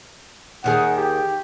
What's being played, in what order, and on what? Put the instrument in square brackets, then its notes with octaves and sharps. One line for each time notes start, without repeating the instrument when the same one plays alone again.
[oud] D#2 D#3 G#4 [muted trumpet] F#5
[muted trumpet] G4